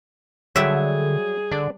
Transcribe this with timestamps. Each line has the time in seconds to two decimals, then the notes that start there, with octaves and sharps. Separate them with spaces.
0.56 D3 F#3 G3 G#4 E5
1.52 D3 D4 D5